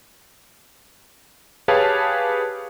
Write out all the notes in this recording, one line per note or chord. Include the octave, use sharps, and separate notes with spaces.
G4 G#4 B4 C#5 F5 A5